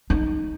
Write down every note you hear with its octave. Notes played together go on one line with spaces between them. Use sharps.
D#4